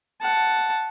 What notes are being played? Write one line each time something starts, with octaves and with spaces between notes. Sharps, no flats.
F#5 A5